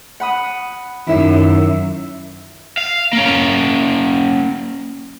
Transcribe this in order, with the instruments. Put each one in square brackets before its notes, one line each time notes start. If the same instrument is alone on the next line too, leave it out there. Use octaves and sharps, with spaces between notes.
[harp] F#5 B5 D#6
[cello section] F#2 [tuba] D#3 [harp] E4 E5
[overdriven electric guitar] F5
A#3 C#4